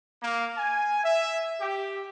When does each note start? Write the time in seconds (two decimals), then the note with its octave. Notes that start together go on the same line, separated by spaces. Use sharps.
0.21 A#3
0.57 G#5
1.04 E5
1.60 G4